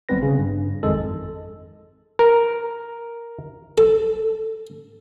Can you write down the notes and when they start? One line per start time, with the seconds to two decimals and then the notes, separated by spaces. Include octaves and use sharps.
0.09 G#1 G3 B3 C4 B4 A#6
0.22 C#3
0.39 G2
0.83 G#1 F2 D#3 G#3 A4
2.19 A#4
3.78 A4